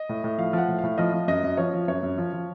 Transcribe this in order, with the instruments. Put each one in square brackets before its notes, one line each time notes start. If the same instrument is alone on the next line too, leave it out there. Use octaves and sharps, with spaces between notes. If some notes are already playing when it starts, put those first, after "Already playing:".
Already playing: [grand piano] D#5
A2
A2
F3 F5
F3 F#5
A2
F5
A2
F3 D#5
F3
F#2 D#5
F#2
F3 C#5
F3
F#2 C#5
F#2
F3
F3